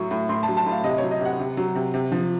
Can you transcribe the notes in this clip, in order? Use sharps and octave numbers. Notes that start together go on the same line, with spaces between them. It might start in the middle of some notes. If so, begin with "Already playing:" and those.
Already playing: A2 F#3 C#6
A2
A2 C6
A5
F#3
A5
A2 F5
C3 D#5
F#3 C#5
D#5
C3 F#5
C3
F#3
C3
C3
F3